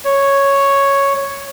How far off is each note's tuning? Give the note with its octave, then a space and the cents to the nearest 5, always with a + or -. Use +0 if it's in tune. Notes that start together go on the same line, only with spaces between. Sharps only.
C#5 +0